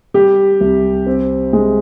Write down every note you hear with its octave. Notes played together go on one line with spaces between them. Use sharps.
G3 G4
C2
C4
G#3